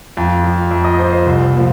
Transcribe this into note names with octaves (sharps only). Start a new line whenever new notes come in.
F2
F3
F2
D#5
F3 C5
C5
C2
A#2 F3